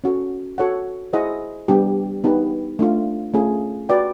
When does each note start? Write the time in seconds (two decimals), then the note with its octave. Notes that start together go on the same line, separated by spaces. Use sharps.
0.04 C#4 F#4 A4
0.58 F#4 A4 C#5 F#5
1.13 E4 G#4 C5 D#5 F#5
1.68 G3 B3 D4 G4
2.24 B3 D#4 G4 B4
2.79 A3 D4 F4
3.34 A3 C#4 F4 G#4
3.89 F#4 B4 D5 G5